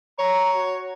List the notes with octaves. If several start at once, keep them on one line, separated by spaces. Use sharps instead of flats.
C#5 A#5
F#4